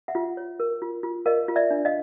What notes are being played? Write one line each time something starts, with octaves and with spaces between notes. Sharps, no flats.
E5 F#5
F4
C#5
A#4
F4
F4
A#4 D#5 F5
F4
D5 E5
D4
D#5 F5